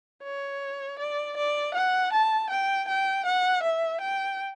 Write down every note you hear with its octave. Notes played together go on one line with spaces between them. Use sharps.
C#5
D5
D5
F#5
A5
G5
G5
F#5
E5
G5